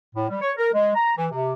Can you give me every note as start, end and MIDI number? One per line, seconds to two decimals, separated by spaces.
0.15 0.27 45
0.28 0.37 55
0.41 0.51 73
0.57 0.68 70
0.74 0.91 56
0.95 1.12 82
1.16 1.26 52
1.31 1.53 48